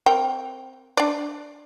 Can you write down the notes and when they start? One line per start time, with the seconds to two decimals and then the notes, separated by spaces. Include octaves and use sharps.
0.06 C4 A#4 G5
0.97 D4 D5